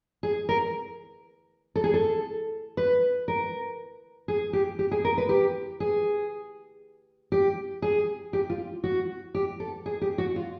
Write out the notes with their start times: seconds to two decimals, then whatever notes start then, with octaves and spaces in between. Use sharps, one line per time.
0.23 G#4
0.49 A#4
1.76 A4
1.84 G#4
1.94 A4
2.77 B4
3.28 A#4
4.28 G#4
4.53 G4
4.79 G4
4.91 G#4
5.05 A#4
5.18 B4
5.29 G4
5.80 G#4
7.32 G4
7.82 G#4
8.33 G4
8.50 F4
8.84 F#4
9.35 G4
9.60 A4
9.86 G#4
10.02 G4
10.18 F#4
10.36 F4